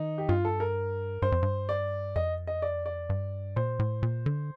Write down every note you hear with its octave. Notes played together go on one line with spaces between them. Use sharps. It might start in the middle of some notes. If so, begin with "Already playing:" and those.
Already playing: D#3 D#4
G4
G2 F4
A4
A#4
G2 C5
F2
G2
D5
F2 D#5
D#5
D5
D5
G2
A#2 C5
A2
A#2
D3